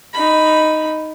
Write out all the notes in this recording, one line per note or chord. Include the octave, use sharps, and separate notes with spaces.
D#4 B5